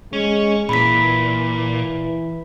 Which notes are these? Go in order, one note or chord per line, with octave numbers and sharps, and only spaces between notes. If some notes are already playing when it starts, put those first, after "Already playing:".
G#3 C#4
A#2 E3 B5 B6